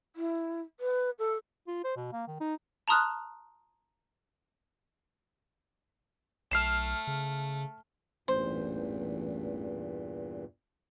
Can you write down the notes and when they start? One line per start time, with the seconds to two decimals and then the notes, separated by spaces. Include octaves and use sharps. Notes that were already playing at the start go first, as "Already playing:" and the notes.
0.16 E4
0.80 B4
1.19 A4
1.67 F4
1.84 C5
1.96 B2
2.12 A#3
2.28 D#3
2.40 D#4
2.88 A5 A#5 C6 D#6 F6 F#6
6.51 B1 A3 F6 C7 E7
7.07 C#3
8.28 A1 E2 G2 A#2 C5